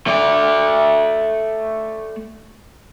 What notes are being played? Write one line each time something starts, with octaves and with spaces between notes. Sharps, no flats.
A3 D5